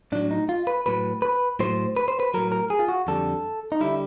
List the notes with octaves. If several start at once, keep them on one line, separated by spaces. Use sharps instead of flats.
A2 F#3 D4
D#4
F4
B4
A2 F#3 B4
B4
A2 F#3 C5
B4
C5
B4
A2 F#3 A#4
A#4
G#4
F4
F#4
F2 D3 G3 A4
D#4
D3 G3 E4